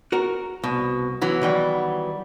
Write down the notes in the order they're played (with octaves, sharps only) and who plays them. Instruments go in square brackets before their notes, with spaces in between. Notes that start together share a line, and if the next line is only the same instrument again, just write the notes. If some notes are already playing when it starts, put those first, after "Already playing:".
[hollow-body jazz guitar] F#4 A#4
[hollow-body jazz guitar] C2 [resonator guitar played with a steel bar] B2
[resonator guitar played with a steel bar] E3 F#3 B3
[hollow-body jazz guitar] D#3 G3 G5